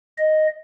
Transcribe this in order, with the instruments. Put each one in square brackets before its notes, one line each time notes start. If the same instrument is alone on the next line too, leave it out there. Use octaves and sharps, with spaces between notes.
[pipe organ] D#5